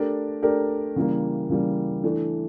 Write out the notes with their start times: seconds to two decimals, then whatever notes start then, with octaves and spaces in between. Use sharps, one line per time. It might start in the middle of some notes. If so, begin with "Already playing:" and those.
Already playing: A3 D4 G4 A#4 D5
0.42 A3 D4 G4 A#4 D5
0.96 C#3 E3 G3 A#3
1.50 C#3 E3 G3 A#3
2.03 E3 A3 D4